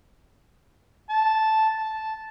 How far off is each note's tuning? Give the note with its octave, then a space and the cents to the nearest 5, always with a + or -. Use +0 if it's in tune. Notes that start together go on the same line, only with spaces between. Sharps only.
A5 -5
A5 -10